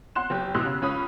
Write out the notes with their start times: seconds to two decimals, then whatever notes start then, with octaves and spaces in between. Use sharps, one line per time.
0.15 F#5 C6 F#6 E7
0.30 F#1 G4
0.55 B2 E3 C6 E6 F#6
0.66 C#3
0.82 C#2 C#4 B5 D#6